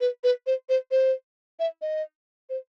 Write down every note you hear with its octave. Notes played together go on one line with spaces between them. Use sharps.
B4
B4
C5
C5
C5
E5
D#5
C5